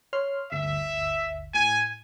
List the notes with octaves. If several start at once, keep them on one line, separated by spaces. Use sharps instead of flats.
C#5 C6 F6
G1 D2 E5
A2 G#5